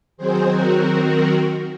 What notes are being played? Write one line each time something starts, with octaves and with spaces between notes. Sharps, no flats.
D#3 F#3 C4 G#4 C5
F#4 A#4